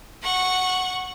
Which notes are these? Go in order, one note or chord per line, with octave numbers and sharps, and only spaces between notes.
F#5 C#6